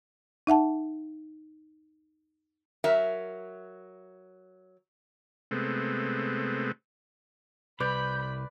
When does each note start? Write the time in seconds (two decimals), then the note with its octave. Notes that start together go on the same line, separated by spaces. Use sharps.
0.47 D#4 E5 F#5 A5
2.84 F#3 A#4 E5
5.51 C3 G#3 A3 B3 C4
7.80 C2 B4 D5 B5 G6